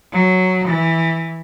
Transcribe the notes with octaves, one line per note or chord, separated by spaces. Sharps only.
F#3
E3